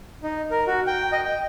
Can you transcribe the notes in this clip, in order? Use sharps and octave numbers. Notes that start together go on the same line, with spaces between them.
D#4
A#4
F#4
G5
D#5
G5